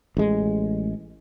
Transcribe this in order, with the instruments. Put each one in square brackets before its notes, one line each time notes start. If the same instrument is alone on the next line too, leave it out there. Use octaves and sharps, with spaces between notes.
[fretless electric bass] A1 G#3